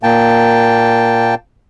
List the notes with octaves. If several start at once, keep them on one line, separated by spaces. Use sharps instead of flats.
A#2 A#3 G5 A5